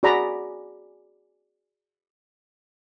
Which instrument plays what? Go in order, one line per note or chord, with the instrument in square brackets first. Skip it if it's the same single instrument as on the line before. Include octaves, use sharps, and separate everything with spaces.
[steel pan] F#4 G#4 D5 F#5 A#5 B5